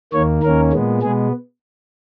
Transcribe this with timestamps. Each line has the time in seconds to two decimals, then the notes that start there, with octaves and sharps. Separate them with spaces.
0.13 D#2 D#3 A#3 C#5
0.43 D#2 D#3 A#3 C#4 A#4
0.73 A#2 G#3 B3
1.02 B2 G#3 B3 G#4